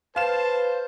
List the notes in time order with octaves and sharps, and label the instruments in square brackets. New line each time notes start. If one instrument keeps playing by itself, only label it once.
[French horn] B4 [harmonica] C5 [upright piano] F5 E7 [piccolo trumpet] A5